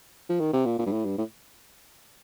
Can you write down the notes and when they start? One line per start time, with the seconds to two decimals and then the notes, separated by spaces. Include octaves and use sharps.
0.29 F3
0.40 D#3
0.53 C3
0.65 A#2
0.78 A#2
0.86 G2
0.92 A2
1.05 G2
1.18 A2